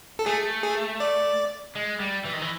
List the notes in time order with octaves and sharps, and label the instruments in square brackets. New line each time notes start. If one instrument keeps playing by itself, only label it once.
[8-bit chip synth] A4
[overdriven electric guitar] A3 [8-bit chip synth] G#4
[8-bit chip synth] G#4
D5
[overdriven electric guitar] G#3
G3
E3
D#3
E3